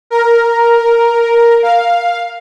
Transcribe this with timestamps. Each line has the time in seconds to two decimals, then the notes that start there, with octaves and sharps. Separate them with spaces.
0.10 A#4
1.63 F5